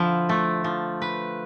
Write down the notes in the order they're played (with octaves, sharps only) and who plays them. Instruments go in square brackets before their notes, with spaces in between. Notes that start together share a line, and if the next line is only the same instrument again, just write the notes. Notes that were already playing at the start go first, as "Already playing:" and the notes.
Already playing: [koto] D3 F3 E4
A3
F3
B4